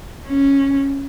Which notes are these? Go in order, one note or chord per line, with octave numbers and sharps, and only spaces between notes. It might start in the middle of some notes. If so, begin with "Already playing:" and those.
C#4